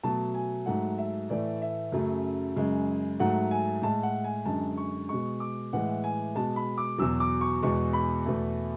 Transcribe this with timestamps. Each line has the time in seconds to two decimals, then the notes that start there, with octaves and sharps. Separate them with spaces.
0.03 B2 F#3 A3 A5
0.34 G#5
0.66 G#2 F#3 A3 F#5
0.98 E5
1.30 A2 E3 A3 D5
1.62 E5
1.92 F#2 C#3 F#3 A3
2.56 F#2 C#3 G#3
3.19 G#2 F#3 A3 F#5
3.51 G#5
3.82 A2 G#3 A5
4.03 F#5
4.24 G#5
4.45 F#2 D3 G#3 A5
4.77 C#6
5.09 B2 G#3 C#6
5.40 D6
5.73 A2 E3 G#3 F#5
6.04 G#5
6.35 B2 G#3 A5
6.56 B5
6.78 D6
6.98 E2 B2 F#3 E6
7.20 D6
7.41 C#6
7.62 E2 B2 G#3 C#6
7.93 B5
8.26 E2 B2 A3